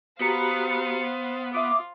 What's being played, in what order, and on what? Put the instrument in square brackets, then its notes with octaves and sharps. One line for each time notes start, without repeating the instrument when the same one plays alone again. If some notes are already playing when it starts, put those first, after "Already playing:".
[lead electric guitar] B3 [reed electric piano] F#4 G4 A#5 [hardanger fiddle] C5 F5 [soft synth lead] C#7
[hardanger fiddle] F4 [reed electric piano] E5 D#6 [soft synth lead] D6